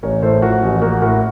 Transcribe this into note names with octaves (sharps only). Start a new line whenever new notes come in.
A1 A#4 C#5
A2 A4 C5
F3 F#4 A#4
A1
A#3 F#4 A#4
A2 F#4 A#4